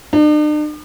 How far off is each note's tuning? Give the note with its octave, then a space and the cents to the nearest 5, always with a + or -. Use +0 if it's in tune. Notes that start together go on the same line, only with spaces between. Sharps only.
D4 +45